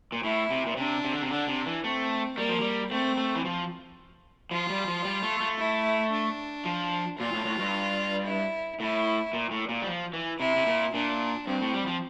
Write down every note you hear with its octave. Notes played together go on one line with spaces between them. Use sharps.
A#2
A2 E4
C3
A#2
C3 D4
C3
D3
C3
D3 D4
C3
E3
A3 C4
G3 A#3
F3
G3
A3 C4
A3
E3
F3
F3 F4
G3
F3
G3
A3
A3
E4
D4
F3
A#2 F4
A2
A2
G2
E4
A2 E4
A#2
A2
A#2
G3
F3
E3
C3 E4
C3
A#2
A#2 D4
G2 C4
A2
G3
F3